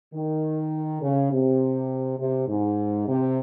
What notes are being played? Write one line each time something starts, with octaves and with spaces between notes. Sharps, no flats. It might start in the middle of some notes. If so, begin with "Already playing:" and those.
D#3
C#3
C3
C3
G#2
C3